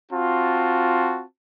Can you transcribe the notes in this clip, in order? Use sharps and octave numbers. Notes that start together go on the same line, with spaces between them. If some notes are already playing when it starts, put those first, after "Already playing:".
C4 F4 F#4 A5